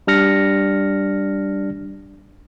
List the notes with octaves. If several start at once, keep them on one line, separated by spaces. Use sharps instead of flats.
G3 D4 F6 A#6 C#7